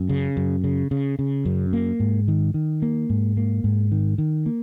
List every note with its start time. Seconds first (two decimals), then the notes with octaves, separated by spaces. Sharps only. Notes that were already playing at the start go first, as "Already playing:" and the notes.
Already playing: F#2
0.09 C#3
0.37 F#2
0.64 C#3
0.91 C#3
1.19 C#3
1.45 F#2
1.73 A#3
2.00 G#2
2.28 D#3
2.54 D#3
2.82 A#3
3.10 G#2
3.37 A#3
3.64 G#2
3.92 D#3
4.18 D#3
4.46 A#3